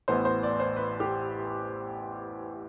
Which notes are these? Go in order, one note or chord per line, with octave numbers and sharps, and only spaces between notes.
A1 A2 E3 B3 C5
C5
D5
C5
B4
G4